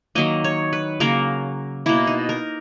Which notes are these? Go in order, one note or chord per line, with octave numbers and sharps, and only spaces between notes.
D#3 F#3 A#3 D#5
C#5
B4
C#3 F#3 A#3 A#4
B2 A#3 E4
D#4
A#4